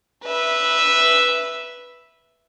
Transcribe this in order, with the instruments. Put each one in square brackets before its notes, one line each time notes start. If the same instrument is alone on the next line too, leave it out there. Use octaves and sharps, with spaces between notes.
[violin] B4 E5